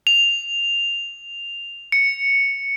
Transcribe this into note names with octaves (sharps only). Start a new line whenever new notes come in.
F7
C#7